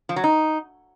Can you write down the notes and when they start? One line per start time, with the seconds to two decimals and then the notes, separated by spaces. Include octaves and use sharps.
0.09 F3
0.16 F#3
0.24 D#4